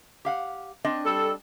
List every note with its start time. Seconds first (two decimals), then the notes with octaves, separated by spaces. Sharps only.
0.25 G4 F5 F#5
0.85 C4 D4 D#5
1.05 G3 A4